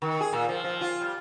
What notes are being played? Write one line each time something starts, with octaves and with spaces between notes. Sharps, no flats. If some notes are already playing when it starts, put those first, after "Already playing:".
D#3
G#4
A#2
F3
F3
F4
G3